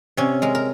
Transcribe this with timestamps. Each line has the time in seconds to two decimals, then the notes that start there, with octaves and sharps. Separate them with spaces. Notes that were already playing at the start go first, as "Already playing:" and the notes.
0.17 C3 C#4
0.42 G#3 A#4
0.55 A#4